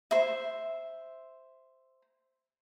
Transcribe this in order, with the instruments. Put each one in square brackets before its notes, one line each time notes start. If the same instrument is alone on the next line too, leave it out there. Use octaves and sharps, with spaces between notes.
[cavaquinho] C5 E5